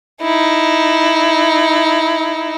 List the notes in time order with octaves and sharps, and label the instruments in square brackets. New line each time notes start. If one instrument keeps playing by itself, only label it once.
[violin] D#4 E4